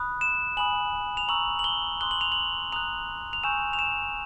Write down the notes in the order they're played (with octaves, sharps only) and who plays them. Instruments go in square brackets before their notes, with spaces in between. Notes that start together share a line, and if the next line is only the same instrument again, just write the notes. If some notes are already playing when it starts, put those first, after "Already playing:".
Already playing: [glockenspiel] B5 D#6 F#6
E7
G#5 B5 D#6 F#7
F7
A#5 C#6 E6 F#7
F#7
G7
C6 D#6 F#6 G7
F#7
F7
F#7
A#5 D#6 F#6 F7
F7
G#5 C#6 E6 G6 E7
F7
E7